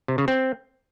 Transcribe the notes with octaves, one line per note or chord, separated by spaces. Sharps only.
C3
C#3
C4